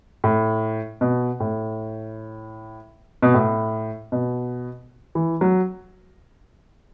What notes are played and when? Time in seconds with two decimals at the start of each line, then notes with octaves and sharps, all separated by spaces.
0.24 A2
1.01 B2
1.40 A2
3.22 B2
3.34 A2
4.12 B2
5.15 E3
5.41 F#3